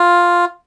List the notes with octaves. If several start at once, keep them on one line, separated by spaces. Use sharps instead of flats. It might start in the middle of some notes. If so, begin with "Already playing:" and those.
Already playing: F4